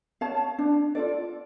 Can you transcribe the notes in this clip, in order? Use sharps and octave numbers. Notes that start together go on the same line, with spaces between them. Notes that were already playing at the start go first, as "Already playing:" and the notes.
C#5 F5 A5
D4
F4 A4 D5